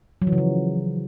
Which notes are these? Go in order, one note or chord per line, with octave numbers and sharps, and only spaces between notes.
F#3
E3
C#3
F3